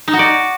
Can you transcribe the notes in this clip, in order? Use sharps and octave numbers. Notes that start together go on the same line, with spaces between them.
D#4
F#4
D5